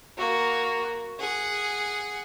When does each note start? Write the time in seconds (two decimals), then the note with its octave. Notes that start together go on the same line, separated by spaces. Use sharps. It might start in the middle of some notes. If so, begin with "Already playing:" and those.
0.18 A#3 F#4
1.20 G#4 F#5